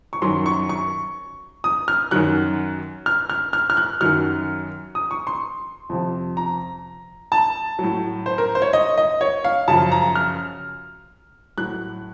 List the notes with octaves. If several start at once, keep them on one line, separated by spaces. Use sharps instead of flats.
C#6
F#2 D#3 F#3 C6
C#6
C#6
D#6
F6
F#2 D#3 F#3 F#6
F6
F6
F6
F6
F#6
F#2 D#3 F#3 F6
D#6
C#6
C6
F2 C3 F3
A#5
A5
A2 F#3
C5
A#4
C5
C#5
D#5
D#5
C#5
F5
F#2 C#3 F3 A5
A#5
F6
A2 F#3 F#6